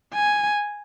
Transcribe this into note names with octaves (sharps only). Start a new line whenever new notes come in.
G#5